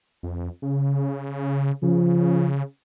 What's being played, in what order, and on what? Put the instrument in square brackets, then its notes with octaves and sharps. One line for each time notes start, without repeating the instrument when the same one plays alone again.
[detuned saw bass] F2
C#3
[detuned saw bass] C#3 [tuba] F3